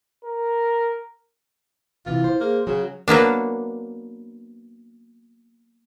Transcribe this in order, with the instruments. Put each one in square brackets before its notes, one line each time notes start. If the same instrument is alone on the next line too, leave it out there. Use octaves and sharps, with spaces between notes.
[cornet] A#4
[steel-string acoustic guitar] C3 E3 [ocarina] E4 [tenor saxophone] F4
[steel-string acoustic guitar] C5
[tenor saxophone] A#3 [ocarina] G#4
[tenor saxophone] C#3 [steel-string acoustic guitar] F#3 [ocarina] F#4
[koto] F#3 A#3 B3 D4